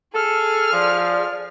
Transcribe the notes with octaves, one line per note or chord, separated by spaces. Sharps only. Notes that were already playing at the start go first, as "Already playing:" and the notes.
G#4 A4 F6
F3 D5